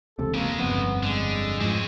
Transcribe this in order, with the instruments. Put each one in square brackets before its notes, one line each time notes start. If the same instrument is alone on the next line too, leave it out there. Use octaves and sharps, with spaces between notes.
[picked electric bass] E1 C#2 C3 [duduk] A4
[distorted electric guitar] C#3 G#3 [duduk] A#3
[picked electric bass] G1 F2 [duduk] B3
[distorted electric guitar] D3 [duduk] G#3
[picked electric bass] G#2 F3 [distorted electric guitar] C4 C#4